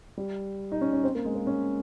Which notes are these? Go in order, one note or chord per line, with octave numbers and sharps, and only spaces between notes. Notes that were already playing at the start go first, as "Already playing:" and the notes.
G3
D#4
C#4
C#4
C4
A#3
G#3
A#3
C#4